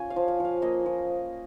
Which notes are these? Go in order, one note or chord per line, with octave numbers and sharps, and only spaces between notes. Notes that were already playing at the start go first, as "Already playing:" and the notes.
Already playing: C#4 F4 G#5
F5
F3
F5
F3 F5
A#3 D#5
F3